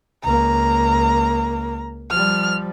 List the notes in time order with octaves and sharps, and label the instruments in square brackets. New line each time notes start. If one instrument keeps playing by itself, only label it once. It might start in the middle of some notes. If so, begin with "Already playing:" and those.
[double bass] C#2 A#3 [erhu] A#5
[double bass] F3 G3 [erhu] F6